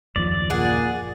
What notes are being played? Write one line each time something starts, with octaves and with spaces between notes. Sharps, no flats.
F#1 D#2 F3 D5
A#2 G#4 F#5